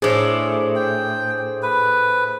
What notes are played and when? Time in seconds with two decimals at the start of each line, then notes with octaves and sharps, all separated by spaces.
0.02 A2 D4 G#4 C5 D6
0.76 G5
1.63 B4